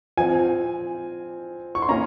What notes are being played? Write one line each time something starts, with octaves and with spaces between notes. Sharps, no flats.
F3 C4 G#5
C#6
C6
A#3 C#4 A#5